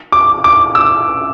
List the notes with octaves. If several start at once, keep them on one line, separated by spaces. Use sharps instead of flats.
D6
D6
E6